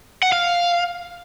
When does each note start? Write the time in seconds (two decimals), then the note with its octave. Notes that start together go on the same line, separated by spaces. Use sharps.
0.23 F#5
0.32 F5